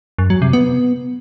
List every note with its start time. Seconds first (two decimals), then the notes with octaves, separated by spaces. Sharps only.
0.19 F#2
0.30 F#3
0.42 C3
0.53 B3